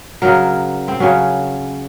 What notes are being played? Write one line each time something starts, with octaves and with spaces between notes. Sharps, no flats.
C#3 F#3 A#4
C4
C#3 F#3 C#4